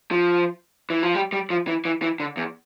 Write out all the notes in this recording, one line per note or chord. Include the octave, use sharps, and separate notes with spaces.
F3
E3
F3
G3
G3
F3
E3
E3
E3
D3
E2